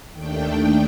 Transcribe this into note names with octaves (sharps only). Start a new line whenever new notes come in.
D#2 D#3 A3 D4 G5